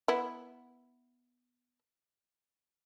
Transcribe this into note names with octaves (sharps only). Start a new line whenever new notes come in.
B3 E4